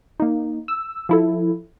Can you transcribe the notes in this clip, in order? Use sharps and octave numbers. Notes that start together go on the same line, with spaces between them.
A#3 D#4
E6
F3 E4 A4